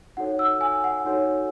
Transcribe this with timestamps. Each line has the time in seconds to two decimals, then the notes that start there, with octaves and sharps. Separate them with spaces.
0.17 D#4 F#4 A4 C#5 F#5
0.39 E6
0.61 G#5
0.84 F#5
1.05 D#4 F#4 A4 C#5